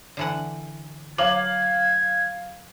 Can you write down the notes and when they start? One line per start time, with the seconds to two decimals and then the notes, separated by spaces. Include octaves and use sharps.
0.17 D3 E3 F#5
1.18 F#3 F5 D6 G#6 F#7